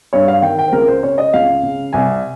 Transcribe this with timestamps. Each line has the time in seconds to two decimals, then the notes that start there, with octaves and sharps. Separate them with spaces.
0.13 G2 C#5
0.28 F5
0.42 D#3 G5
0.59 G5
0.68 C5
0.72 C#2 A#4
0.88 C5
1.03 C#3 C#5
1.18 D#5
1.34 C#2 F5
1.63 C#3
1.93 C2 G#5